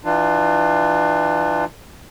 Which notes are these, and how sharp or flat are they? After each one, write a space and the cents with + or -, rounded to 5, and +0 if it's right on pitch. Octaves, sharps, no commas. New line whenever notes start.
E3 +0 D4 +35 F4 +0